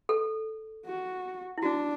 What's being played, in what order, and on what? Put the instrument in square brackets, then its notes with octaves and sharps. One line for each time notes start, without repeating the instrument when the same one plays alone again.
[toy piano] A4
[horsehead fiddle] F#4
[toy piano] E4
[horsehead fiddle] D4 [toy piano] F#4